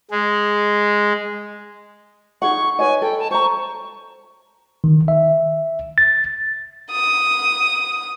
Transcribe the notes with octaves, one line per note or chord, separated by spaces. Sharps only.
G#3
D#4 G#4 F#5 C#6
B4 C#5 D#5 G#5
A4 G5 B5
A5
C5 A#5 C#6
D#3
E5
A6
D#6